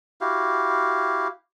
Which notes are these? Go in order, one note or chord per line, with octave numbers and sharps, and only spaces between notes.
E4 F#4 G4 F5